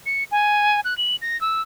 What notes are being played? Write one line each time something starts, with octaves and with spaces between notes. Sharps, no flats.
C#7
G#5
F#6
F#7
A#6
E6